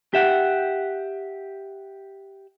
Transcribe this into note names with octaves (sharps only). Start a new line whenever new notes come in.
G4 E5 F#5